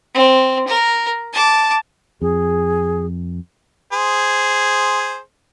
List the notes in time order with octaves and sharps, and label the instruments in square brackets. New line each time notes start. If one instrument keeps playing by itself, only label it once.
[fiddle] C4
A#4
A5 D6
[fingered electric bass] F2 [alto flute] G#4
[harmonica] G#4 C5